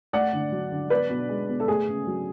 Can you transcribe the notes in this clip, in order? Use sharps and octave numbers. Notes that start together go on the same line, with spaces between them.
A3 D5 F#5
D3
F#3
D3
B3 B4 D5
B2
G#3
B2
A4
A3 G#4
C#3
F#3